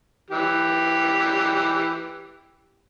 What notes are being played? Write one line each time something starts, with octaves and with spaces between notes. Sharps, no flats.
E3 G4